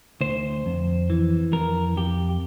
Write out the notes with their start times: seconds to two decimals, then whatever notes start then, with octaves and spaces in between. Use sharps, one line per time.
0.21 D2 C5
0.66 F2
1.10 E3
1.52 F2 A#4
1.97 F2 G4